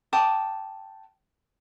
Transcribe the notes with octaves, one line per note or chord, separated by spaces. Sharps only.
G5 A5 D6 D#6